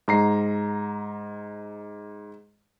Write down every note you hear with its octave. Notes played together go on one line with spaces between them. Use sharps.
G#2 A#5 C7